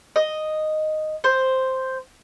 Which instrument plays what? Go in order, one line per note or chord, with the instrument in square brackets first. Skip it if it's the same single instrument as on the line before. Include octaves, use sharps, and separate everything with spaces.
[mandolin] D#5
C5